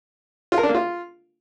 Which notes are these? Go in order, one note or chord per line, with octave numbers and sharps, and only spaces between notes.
F4
A#4
D4
A#3
F4